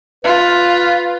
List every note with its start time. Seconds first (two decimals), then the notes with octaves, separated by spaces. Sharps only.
0.24 F4 B4